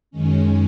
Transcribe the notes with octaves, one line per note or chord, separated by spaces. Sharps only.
F#2 D#3 G#3 C#4